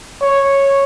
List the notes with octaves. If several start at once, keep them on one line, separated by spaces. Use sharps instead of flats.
C#5